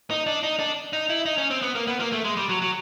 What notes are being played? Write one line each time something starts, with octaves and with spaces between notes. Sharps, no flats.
D#4
D4
D#4
D4
D#4
E4
D#4
C#4
C4
B3
A#3
B3
A#3
A3
G#3
G3
F#3
F#3